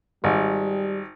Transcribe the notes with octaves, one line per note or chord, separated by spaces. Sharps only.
G#1 G3